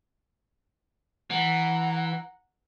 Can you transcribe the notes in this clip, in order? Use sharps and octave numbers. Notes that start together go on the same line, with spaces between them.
E3 F#5 A#5